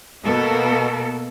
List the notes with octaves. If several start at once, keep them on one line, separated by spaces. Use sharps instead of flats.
B2 A#3 B3 A4 A#4